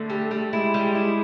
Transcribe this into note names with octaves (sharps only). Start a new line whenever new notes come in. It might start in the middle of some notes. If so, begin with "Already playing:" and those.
Already playing: D3 A3
G3
G3
G#3 E4
G3
E4